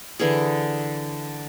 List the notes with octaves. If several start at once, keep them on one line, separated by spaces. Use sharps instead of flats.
D3 E3 G#4